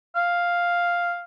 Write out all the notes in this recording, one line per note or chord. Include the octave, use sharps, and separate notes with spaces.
F5